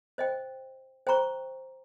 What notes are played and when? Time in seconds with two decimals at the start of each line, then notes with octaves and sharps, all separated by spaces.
0.18 C5 D#5 G5
1.07 C5 G5 A#5 C#6